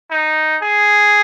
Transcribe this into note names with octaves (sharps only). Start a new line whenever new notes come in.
D#4
G#4